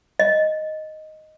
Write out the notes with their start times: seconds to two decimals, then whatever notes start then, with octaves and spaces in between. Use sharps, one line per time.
0.19 D#5